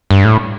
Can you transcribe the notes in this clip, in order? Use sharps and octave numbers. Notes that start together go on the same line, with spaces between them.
G2
A2